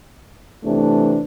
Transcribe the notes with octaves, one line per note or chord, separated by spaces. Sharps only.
C3 E3 A3 D4